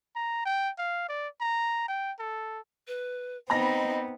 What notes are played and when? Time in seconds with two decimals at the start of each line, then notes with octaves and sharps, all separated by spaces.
0.15 A#5
0.46 G5
0.78 F5
1.09 D5
1.41 A#5
1.88 G5
2.19 A4
2.87 B4
3.50 B3 C4 D#4 D#5 A#5 B5 A#6